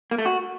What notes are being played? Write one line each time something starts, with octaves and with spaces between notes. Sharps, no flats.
A#3
A3
F#4